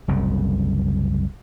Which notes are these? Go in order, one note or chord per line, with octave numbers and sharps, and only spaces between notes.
F#1 C2 C#3